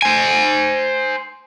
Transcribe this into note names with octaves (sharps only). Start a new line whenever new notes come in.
C5 G#5